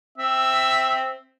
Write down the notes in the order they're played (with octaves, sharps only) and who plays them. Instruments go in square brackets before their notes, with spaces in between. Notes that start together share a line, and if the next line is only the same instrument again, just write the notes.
[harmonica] C4 E5